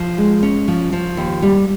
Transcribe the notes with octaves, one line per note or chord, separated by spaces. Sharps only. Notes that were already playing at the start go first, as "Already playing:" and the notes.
Already playing: F3
G#3
C#4
F3
F3
D#2
G3